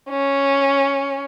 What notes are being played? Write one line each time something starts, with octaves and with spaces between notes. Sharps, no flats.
C#4